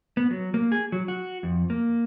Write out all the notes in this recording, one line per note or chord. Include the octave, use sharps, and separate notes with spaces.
B3
F#3
A#3
G#4
F#3
F#4
F2
A#3